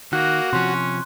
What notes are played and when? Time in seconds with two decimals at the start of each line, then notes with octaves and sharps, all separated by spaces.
0.13 D#3 A#3 F#4 F#6
0.53 C3 F3 C#4 C6